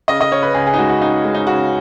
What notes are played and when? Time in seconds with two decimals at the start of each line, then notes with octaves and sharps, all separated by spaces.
0.08 C#3 D#5
0.21 D#5
0.32 C#3 C#5
0.43 B4
0.54 C#2 G#4
0.67 G#4
0.74 D#4
0.78 G#3 F#4
0.89 F#4
1.00 C#2 D#4
1.25 G#3
1.35 D#4
1.47 C#3 F#4